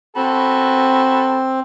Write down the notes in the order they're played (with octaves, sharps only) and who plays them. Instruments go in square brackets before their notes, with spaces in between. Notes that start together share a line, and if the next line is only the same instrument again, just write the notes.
[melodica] C4 [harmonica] F#4 A4 B5